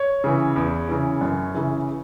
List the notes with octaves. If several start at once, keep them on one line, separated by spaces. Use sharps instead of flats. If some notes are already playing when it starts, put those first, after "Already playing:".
Already playing: C#5
C#3 E3
E2
C#3 E3
F#2
C#3 E3